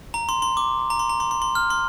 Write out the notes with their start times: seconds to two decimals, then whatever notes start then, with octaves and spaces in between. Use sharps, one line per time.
0.14 A#5
0.29 C6
0.42 C6
0.57 D6
0.90 A#5
0.99 C6
1.09 A#5
1.20 C6
1.31 C6
1.42 C6
1.55 F6
1.70 C6